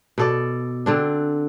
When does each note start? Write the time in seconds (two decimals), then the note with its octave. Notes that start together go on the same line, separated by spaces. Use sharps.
0.18 B2 A4 D5
0.86 D3 C4 D4